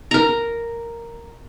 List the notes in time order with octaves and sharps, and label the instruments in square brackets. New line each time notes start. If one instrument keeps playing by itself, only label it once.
[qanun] A#4 A#5